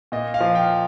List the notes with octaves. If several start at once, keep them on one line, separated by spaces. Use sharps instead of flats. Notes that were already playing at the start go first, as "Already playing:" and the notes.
A#2 D#5
F5
F3
G5